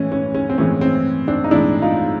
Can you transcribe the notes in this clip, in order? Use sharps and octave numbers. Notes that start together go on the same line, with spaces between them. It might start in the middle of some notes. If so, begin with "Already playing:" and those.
Already playing: A2 E3 G#3 C#4
C#4
C#4
C4
A2 E3 G#3 C#4
C4
C4 D4
D#4
A2 E3 G#3 D4 E4
D#4 F4